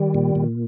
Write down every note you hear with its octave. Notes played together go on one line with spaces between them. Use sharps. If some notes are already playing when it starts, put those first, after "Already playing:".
Already playing: D#3 G3
A#2
A#2